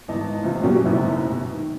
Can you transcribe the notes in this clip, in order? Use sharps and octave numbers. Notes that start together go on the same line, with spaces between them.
G#1 E3 B3 D#5 A5
A2 C3 E3 F3 C4 F4
B2 F#3 A#3 C#4 F#4 G4
F#1 B1 F#2 A2 C3 E3
B2
D#3